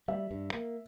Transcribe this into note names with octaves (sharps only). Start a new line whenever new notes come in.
G3 E5
G2
A#3